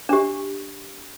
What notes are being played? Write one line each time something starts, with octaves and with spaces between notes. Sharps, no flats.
D4 G4